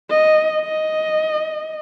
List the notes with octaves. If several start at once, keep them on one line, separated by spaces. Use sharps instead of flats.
D#5
D#5